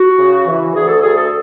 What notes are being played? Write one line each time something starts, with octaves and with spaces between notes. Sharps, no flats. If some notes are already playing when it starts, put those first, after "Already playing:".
Already playing: F#4
C#3
E3
D2 G#4
A4
D2 G#4
A4